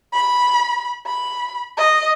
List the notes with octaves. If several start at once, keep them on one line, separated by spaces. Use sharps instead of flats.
B5
B5
D#5